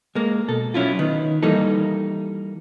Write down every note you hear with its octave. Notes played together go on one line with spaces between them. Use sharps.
G#3 A#3
B2 A4
F#3 C#4 E4 F4
D#3 B3
E3 G3 A#3 D#4 A4